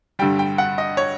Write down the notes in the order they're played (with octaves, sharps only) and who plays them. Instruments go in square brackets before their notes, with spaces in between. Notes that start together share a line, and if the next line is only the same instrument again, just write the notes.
[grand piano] G2 D3 G3 G5
G5
F#5
D#5
C#5